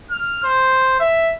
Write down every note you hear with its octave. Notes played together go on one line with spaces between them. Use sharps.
F6
C5
E5